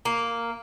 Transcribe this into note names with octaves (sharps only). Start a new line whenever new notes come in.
A#3